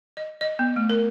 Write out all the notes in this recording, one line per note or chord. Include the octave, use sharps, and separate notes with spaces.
D#5
D#5
B3
A3
A#4